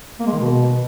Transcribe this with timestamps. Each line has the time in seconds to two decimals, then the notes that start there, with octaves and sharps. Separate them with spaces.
0.20 A#3
0.26 G#3
0.33 D#3
0.39 B2